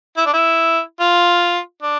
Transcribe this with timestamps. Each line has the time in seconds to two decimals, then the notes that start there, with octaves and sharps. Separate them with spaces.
0.17 E4
0.26 D4
0.34 E4
1.00 F4
1.83 D4